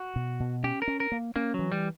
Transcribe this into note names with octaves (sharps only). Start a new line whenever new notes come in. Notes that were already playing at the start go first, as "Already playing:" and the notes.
Already playing: F#4
B2
B2
C#4 G4
A#4
C#4
A#4
A#3
A#3 C#4
E3 F#3
G3